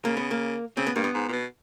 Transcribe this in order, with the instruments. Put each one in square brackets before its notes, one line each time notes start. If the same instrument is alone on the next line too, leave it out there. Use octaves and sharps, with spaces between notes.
[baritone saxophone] C#3 [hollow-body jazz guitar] A#3
[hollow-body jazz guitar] B3
A#3
[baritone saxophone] C#3 [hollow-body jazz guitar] C4
[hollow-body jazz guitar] B3
[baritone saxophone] G2 [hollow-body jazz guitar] A#3
[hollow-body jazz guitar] B3
[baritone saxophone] G#2
A#2
B2